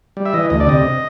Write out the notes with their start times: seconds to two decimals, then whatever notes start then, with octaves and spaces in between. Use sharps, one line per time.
0.17 G3
0.26 E5
0.34 E3 D#5
0.50 D2 D#5
0.60 D5
0.67 C3 D#5